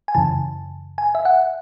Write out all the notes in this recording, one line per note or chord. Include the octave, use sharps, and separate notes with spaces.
G#5
F#2 C#3 E3 A5
G#5
E5
F#5